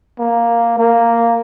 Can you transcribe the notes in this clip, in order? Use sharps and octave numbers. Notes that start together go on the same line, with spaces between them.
A#3
A#3